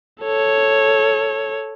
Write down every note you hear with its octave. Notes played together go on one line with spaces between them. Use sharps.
A4 C#5